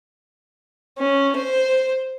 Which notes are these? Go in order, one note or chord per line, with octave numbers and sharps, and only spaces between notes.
C#4
C5